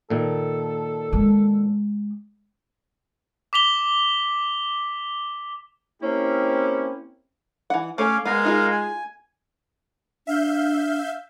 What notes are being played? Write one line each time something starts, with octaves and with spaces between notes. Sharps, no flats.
A#2 D#3 A4
G#3
D6 B6 F7 G7
A#3 C4 C#4 E4 G4
E3 F#5
A3 C#4 A4 C#5 F5 G#5 D6
G#3 B3 A#4 F5
D#4 F4 G#4
G#5
D4 E5 F5 G6